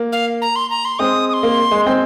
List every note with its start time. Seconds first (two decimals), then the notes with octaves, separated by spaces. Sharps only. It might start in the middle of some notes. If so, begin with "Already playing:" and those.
Already playing: A#3
0.12 F5
0.42 A#5
0.56 C6
0.70 A#5
0.85 C6
0.99 G#3 C4 D#6
1.29 D#6
1.33 C6
1.43 A#3
1.71 G#3
1.86 G#3 C4 C6